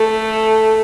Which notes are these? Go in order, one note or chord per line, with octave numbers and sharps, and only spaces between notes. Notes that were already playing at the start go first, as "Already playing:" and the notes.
Already playing: A3